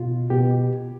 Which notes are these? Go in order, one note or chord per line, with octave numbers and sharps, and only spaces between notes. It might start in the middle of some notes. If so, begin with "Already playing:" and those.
Already playing: B2 F4
B2 G4